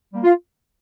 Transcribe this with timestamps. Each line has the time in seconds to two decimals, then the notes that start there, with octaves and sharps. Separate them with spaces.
0.13 G3 A#3
0.24 F4